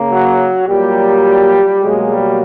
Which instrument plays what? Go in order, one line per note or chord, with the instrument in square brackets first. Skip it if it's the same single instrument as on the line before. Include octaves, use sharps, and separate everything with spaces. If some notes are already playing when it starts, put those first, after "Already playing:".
Already playing: [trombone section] C#3 A#3
F#3 F#4
A#2 F#3 G3 A#3 G4
B2 F#3 G#3 A#3 G#4
G3 G4